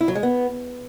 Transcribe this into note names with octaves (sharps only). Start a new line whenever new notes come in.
E4
F#3
G#3
B3